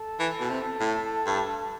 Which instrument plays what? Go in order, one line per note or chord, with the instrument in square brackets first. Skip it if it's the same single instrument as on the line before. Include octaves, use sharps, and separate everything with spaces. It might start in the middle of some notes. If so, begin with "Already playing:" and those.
Already playing: [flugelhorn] A4
[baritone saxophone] E3
B2
C3
A2
G2